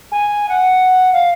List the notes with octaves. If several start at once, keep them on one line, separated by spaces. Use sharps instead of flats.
G#5
F#5
F5